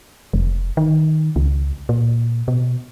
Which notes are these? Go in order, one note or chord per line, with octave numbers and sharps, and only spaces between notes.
F1
D#3
C#2
A#2
B2